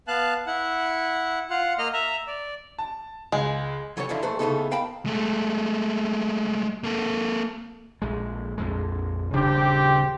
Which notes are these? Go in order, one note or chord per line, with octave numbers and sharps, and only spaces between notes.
B3 F5 A5 F#6
E4 F#5
F4 F#5
A#3 D#5 F6
E5 A#5
D5
A5
C#2 G#3
E3 F#3 G3 A4 C#5
F2 D3 F3 D4 E4
B1 A#2 A3 B4 C5
A2 C#3 A3 B3 D#4 A4
A#4 F5 G5 A5 B5
G#3 A3
A#3 A4
A#1 G#3
A#1 F2 G#3
D#1 C#3 C4 D4 G4